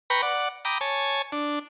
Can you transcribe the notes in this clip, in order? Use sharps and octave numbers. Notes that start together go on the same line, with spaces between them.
B4 G5 A#5 B5 C#6
D5 F#5
G5 A#5 B5 D6 D#6
C#5 G#5 A5
D4